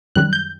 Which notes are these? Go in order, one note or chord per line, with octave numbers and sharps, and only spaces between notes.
F#2 D#3 G3 F#6
G6